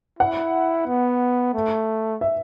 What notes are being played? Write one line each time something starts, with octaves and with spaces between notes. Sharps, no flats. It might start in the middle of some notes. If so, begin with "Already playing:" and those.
E4 F#5
B3
A3
E5